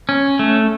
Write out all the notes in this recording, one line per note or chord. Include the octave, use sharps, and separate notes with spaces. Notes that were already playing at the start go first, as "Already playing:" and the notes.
C#4
A3